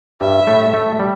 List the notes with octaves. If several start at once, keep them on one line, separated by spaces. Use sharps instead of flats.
G2 G3 E5
A2 A3
A2 A3
G3